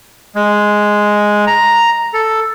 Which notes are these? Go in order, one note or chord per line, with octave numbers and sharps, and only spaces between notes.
G#3
A#5
A4